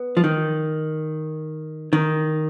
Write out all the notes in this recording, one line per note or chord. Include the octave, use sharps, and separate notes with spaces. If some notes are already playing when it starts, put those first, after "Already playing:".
Already playing: B3
F3
D#3
D#3